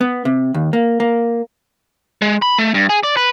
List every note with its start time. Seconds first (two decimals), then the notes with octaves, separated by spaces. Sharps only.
0.01 B3
0.25 C3
0.54 D#2
0.73 A#3
1.00 A#3
2.22 G#3
2.42 B5
2.59 A3
2.74 G2
2.89 G#4
3.03 D5
3.17 B4